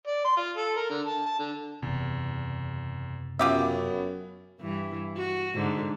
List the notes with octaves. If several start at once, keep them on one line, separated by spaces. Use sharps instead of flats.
D5
C6
F4
A4
A#4
D3
A5
A5
D3
F#1 E2 C3
F#2 B3 C#4 F4 G4 E5
G2 E3
F#4
G#2 D3